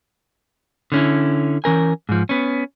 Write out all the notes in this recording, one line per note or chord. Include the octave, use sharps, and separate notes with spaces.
D3 C#4 E4
E3 C#4 A#4 G#5
G#2 F3
B3 C#4